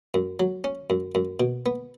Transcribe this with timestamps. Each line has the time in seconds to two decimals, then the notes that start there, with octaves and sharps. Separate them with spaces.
0.14 F#2
0.40 F#3
0.64 C#4
0.90 F#2
1.15 F#2
1.40 B2
1.66 B3